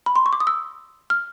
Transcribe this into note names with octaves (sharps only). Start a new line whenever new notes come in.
B5
C6
C#6
D6
D#6
E6
F6